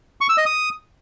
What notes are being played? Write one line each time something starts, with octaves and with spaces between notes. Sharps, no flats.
C#6
E6
D#5
D#6